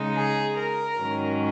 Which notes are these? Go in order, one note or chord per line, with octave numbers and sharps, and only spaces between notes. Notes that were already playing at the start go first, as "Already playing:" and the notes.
Already playing: C#3 G#3 D#4
G#4
A#4
G#2 D#3 F#3 C#4